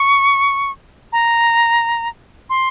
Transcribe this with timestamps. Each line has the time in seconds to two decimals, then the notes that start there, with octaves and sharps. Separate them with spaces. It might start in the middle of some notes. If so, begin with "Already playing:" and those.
Already playing: C#6
1.12 A#5
2.50 C6